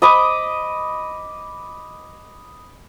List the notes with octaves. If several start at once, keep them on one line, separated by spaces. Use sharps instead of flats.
D#5 B5 D6 D#6